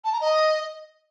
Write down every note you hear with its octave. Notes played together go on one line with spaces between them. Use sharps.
A5
A#5
D#5